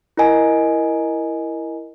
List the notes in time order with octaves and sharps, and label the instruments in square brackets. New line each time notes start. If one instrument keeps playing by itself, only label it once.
[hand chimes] E4 A#4 D#5 G#5